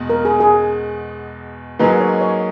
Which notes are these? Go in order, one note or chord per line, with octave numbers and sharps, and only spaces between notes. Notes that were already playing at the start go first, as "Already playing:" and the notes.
Already playing: E2 B2 G#3
A#4
G#4
G#4
G#2 F#3 A#3 D#4 G#4 B4
C#5
C#5